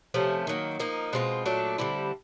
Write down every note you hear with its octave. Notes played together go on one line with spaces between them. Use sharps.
C3 F3 A3 C#4
D#3 F#3 A#3
F3 A#3 D#4
B2 G#3 C4 F4
A#2 F#3 A3 D4
D3 G3 C4 E4